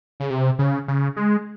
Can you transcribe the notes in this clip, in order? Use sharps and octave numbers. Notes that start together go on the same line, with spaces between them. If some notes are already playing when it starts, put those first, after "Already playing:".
C#3
C3
C#3
C#3
G#3